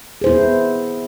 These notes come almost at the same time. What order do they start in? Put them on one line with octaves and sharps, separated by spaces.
G#4 C5 E4 B3